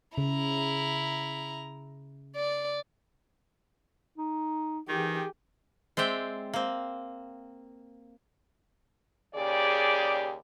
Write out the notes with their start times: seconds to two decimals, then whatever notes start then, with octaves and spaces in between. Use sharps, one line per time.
0.18 C#3 E4 A#5
2.36 D5
4.18 D#4
4.89 D#3 E3 G4 G#4
5.97 G#3 C4 D5 E5 G5
6.54 A#3 C4
9.35 D#2 C#3 G4 G#4 D5